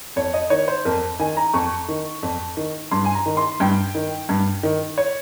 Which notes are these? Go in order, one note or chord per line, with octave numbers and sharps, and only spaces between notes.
F2 C#5
D#5
D#3 C#5
C5
F2 A#4
D#3 G#5
A#5
F2 C#6
D#3
F2
D#3
G2 C6
G#5
A#5
D#3
C6
G2 G5
D#3
G2
D#3
C#5